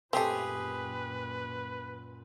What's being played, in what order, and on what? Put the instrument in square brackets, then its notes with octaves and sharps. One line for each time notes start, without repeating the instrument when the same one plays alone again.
[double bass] F#2 A#2 [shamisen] A3 C4 [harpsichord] G4 G#4 [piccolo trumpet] B4